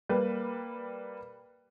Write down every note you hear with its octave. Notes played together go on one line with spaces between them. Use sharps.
G3 A#3 B4